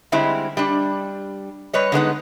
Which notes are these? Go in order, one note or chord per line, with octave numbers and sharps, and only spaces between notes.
D3 G3 G#3 C4 E4
G3 D4
G3 B4 C#5 D#5
D3 G#3 B3 D#4